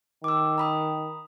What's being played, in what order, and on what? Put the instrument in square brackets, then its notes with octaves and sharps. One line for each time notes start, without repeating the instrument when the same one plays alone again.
[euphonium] D#3 [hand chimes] D6 E6
[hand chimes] A#5 B5 D#6